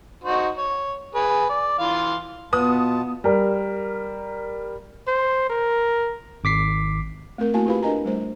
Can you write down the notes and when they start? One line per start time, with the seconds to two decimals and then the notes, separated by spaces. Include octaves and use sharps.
0.24 D#4 F#4 C5
0.58 C#5
1.15 G#4 B4
1.49 D5
1.79 E3 F5 C6
2.53 B2 B3 F4 B4 A5 D#6
3.24 G3 A#4
5.08 C5
5.50 A#4
6.44 G#1 D6 B6 C7
7.38 A3 C4 A#4
7.54 A3 A#3 E4 F#4 G#5 A5
7.66 E4 F4 G4 B4 F5 B5
7.83 D4 A#4 D#5 G#5 A#5
8.05 G3 A3 C5